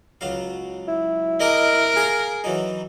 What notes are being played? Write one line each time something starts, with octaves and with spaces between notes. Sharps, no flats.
C#2 F#3 F5
E4
G#4 A#4 D#5 A#5 D6
F4 G#4 A#5
E3 F#3 D#4